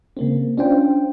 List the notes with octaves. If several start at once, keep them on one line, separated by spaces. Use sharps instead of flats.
C#3 A#3 C4
C#4 D4 F4 C5 G5